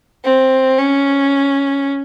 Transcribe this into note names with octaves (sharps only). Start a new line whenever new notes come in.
C4
C#4